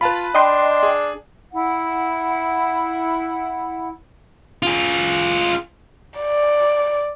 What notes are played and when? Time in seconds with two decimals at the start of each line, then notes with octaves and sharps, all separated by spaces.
0.01 F4 B4 A5 B5
0.35 D4 D#5 G5 C6
0.83 G#4
1.52 E4 F#5
4.63 F4 G#4
6.19 D5